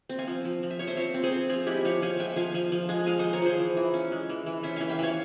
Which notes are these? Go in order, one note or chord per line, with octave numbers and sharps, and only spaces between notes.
C4
F5 G#5
F3
F3
F3
E5
F3 C#5
C5 E5
C4 C#5 F5
C4
G#4 C5
C4
F3 F4 G#4
G#3 E4 G4
F3 C#5 F5
F3 F5 G#5
G#3 E5 G5
F3 F5 G#5
F3 F5 G#5
F3
G#3 F5 G#5
G#3 F5 G#5
F3 G#4 C5
A#4 C#5
F3 G#4 C5
E3
E3
C#4
G#3
E3
E3
C#4 C5 E5
E3 F5 G#5
E5 G5
E3 C#5 F5